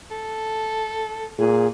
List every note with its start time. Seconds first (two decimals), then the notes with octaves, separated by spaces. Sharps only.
0.11 A4
1.38 A#2 G#4